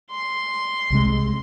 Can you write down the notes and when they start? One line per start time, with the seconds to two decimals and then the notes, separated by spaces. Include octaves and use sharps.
0.11 C6
0.90 C2 C3 G#3